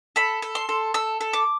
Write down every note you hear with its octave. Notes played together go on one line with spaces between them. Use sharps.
A4 B5
A4
C6
A4
A4 E6
A4
D6